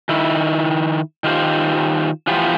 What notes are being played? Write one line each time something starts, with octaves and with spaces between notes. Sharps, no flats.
D#3 E4
D#3 F4 G4 C5
E3 F3 B3 F4 G4